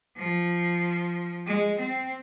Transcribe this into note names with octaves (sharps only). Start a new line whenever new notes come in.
F3
G#3
C4